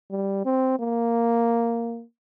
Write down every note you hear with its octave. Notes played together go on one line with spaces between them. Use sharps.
G3
C4
A#3